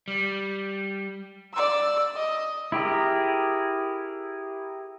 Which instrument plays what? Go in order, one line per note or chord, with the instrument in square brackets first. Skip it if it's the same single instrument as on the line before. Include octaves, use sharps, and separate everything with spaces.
[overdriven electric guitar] G3
[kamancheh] D5 E6
D#5
[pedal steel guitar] E4 G4 G#4 A#4